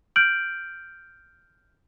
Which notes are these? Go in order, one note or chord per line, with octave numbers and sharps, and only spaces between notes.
F6 G6 D7 F#7